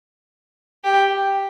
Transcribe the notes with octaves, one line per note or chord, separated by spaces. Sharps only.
G4